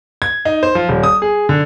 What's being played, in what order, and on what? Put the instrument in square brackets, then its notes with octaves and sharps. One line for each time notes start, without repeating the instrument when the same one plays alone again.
[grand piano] G#6
D#4
C5
F3
D#1
D#6
G#4
D3